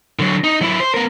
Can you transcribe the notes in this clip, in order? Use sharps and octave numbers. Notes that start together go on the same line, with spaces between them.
D3 F#3
D#4
F#3 E4
C5
B3 A#4